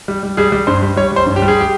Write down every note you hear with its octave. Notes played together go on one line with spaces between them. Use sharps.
G3
G3
G3 G#4
G3
G2 C5
G3
G3 C#5
G3 C5
G2
G4
G3
G#4
G4